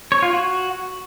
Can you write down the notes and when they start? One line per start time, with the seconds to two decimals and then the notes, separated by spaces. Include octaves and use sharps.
0.12 C#5
0.22 F4
0.33 F#4